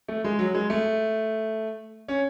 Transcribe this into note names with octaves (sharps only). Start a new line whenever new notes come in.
A3
G#3
F#3
G#3
A3
C#4